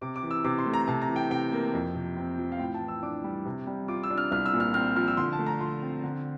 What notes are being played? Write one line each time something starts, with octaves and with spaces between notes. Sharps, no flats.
C3 D6
D6
E3
E6
C3 D6
C6
A3
A#5
C3 A5
A#5
E3
G5
C3 G5
A#3
F2
C3
C4
F3
F5
A2 G5
A5
E3
E6
D4 D6
G3
C3
G3
F4 D6
E6
D4
F6
C2 F6
E6
A#2
F6
C4 F6
F3 F6
E6
D3 C6
A5
A3
A#5
F4 C6
C4
D3